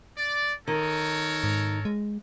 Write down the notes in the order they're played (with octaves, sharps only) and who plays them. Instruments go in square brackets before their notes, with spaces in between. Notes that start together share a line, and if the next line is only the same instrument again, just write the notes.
[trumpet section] D5
[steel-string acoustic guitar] D#3 [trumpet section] A4 A#4 C#5
[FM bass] G#2
G#3